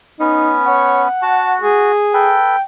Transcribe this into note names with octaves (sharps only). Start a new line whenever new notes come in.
B3 C#4 D#4
C#5 F#5
F#4 A5
G#4
A4 B4 G5